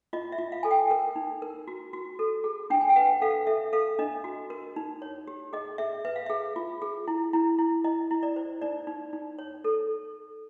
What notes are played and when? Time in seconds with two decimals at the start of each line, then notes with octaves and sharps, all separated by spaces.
0.13 F4 D#5
0.32 E5
0.38 F4
0.52 F5
0.63 A4 G#5
0.71 G5
0.91 A#4
1.16 D#4
1.42 A#4
1.68 F#4
1.93 F#4
2.19 A4
2.44 G#4
2.70 D4 G5
2.81 G#5
2.89 G5
2.96 B4 F#5
3.22 A4 F5
3.47 A4 E5
3.73 A4 F5
3.99 D4 D#5
4.24 F#4
4.50 A#4
4.76 D#4
5.02 C#5
5.27 G4
5.53 G#4 D#5
5.78 G#4 E5
6.05 B4 E5
6.16 F5
6.26 G#4 E5
6.56 F4
6.82 G#4
7.08 E4
7.33 E4
7.59 E4
7.84 E4 D#5
8.11 E4
8.23 D5
8.36 C5
8.62 D#4 D5
8.87 D#4
9.13 D#4
9.39 C#5
9.64 A4